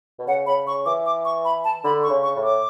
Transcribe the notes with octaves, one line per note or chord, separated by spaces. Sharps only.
B2
C#3 F#5
C#3 B5
C#3 C#6
E3 D6
D6
C#6
B5
A5
D3 B5
C#6
C#3
C#6
A2
D6